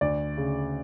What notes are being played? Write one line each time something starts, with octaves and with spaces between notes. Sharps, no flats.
D2 D5
C#3